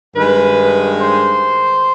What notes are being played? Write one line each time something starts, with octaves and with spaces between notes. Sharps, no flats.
G2 D#3 G#3 B4
C5